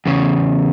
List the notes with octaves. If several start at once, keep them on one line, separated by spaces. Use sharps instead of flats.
E2 C#3